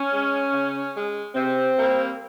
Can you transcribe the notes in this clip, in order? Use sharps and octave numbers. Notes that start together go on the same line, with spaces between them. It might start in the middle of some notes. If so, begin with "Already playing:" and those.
Already playing: C#4
G#3
C#3
G#3
C3 C4
G3 A#3